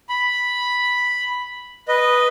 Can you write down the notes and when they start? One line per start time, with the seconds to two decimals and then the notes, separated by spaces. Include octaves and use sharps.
0.09 B5
1.88 B4 D#5